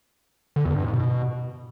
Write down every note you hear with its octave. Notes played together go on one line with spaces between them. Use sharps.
D3
E2
G2
G#2
B2